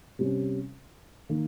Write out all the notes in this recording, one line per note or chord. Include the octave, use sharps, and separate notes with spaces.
C3 G3 C#4
D#3 A#3